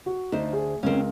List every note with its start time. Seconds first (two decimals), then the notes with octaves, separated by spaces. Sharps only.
0.06 F#4
0.32 D2 D#4 C5 A5
0.53 G#4
0.83 C#2 C4 C#4 A#4